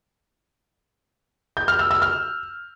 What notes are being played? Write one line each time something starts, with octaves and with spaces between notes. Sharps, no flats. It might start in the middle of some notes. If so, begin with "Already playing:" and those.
G6
F6
E6
E6
F6